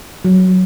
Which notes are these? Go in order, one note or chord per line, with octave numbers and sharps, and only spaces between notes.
F#3